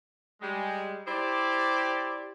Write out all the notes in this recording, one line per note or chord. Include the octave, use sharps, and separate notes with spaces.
G3 G#3
E4 G4 C5 D5